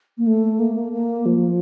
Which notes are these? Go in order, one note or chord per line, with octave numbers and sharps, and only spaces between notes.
A#3
A3
A#3
A#3
A#3
F3